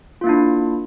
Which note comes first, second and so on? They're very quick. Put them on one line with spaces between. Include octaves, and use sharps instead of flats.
F4 A#3 E4 D4